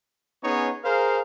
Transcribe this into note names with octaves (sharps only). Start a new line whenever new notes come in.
B3 C#4 D#4 G#4 C#5
G#4 A#4 C5 F5